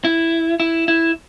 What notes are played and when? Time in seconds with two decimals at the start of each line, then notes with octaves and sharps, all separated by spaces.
0.04 E4
0.60 E4
0.88 E4